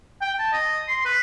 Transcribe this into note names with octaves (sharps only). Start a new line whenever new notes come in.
G5
A5
D#5
C6
B4